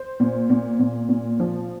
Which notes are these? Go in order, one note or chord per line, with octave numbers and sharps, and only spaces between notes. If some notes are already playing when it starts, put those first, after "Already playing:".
Already playing: C5
A#2
A#2
A#2
A#2
F3